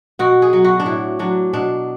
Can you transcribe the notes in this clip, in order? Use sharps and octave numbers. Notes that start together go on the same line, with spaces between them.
B2 F#4
G#4
F#3
F#4
D4
A2 E4
F#3 D4
B2 D4